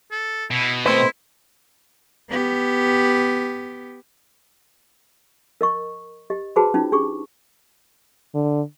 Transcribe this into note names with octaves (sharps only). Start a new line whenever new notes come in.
A4
B2 E4
D#3 A3 C4 E4 B4 C5
B3 G4
A#4 D#5 C#6
G4 D#5
F#4 G#4 B4 C5 A5 B5
C#4 D#4 F4
D4 G4 G#4 C#6
D3